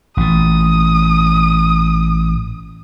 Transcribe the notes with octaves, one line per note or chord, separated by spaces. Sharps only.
A1 A#2 D#6